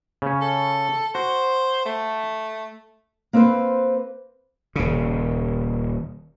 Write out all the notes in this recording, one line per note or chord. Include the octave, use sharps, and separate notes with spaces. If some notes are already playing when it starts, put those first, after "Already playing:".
C#3 C#4
A4
F#4 C5
A3
A#3 C4 A4 B4 C5
D#1 C#3